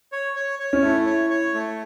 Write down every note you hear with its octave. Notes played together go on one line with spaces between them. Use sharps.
C#5
C#5
C#5
C#4
A3 E4
C#5
C#5
A3